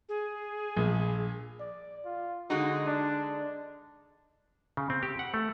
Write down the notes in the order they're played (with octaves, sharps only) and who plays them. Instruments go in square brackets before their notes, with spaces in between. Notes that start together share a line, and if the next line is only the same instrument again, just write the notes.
[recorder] G#4
[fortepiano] A#1
[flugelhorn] D5
F4
[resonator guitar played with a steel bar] D3 G#3 D#4 [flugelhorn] F#4
[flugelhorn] D4
[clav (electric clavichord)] C#3
C4
G4
F#5
A3